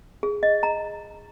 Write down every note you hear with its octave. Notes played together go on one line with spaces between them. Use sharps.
G#4
D#5
A#5